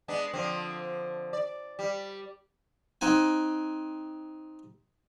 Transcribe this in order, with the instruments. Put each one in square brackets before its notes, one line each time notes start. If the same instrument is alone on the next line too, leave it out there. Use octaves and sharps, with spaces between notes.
[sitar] G#3 B3 D4
D3 F3 C4
D5
G3
[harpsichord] C4 D#4 F#5 G#5